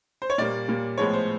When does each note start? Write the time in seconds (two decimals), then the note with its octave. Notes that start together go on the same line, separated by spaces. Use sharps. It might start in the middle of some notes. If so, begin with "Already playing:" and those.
0.22 C5
0.30 C#5
0.38 A#2 G3 A#3 D5
0.68 A#2 G3 A#3
0.98 A2 F3 G#3 B3 C#5
1.13 C5